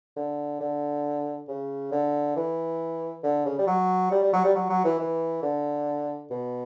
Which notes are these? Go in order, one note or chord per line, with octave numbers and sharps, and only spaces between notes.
D3
D3
C#3
D3
E3
D3
C#3
G3
F#3
G3
G3
F#3
G3
F#3
F#3
E3
E3
D3
B2